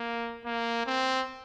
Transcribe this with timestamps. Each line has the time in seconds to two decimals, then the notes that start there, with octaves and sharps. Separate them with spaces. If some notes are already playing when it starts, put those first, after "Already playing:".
Already playing: A#3
0.45 A#3
0.86 C4